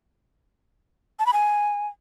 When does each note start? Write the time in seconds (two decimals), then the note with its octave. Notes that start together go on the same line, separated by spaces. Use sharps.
1.19 A5
1.26 B5
1.33 G#5